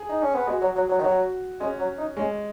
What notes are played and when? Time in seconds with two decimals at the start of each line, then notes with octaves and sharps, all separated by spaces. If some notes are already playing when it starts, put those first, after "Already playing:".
Already playing: G#4
0.09 D#4
0.22 C#4
0.35 B3
0.47 G#3 F#4
0.62 F#3
0.76 F#3
0.89 F#3
0.99 D#3
1.04 F#3 F#4
1.60 G#3 C#4
1.79 F#3
1.98 D#4
2.17 G#3 C#4